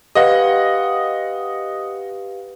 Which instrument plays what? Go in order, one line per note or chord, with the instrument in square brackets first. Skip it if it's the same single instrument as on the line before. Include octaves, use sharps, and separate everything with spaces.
[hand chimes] G4 B4 F5 [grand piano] D#5 F#5